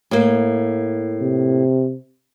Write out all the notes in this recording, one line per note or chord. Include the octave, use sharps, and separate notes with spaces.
A2 A#3
C3